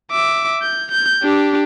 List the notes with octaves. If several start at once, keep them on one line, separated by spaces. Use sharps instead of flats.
E5 D6
G6
G6
D4 G4